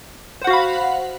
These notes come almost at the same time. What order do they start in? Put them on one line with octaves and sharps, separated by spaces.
C5 F#5 F#4 F5 B5